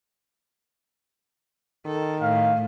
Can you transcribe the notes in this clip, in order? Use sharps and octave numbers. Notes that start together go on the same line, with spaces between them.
D#3 A4
A2 F5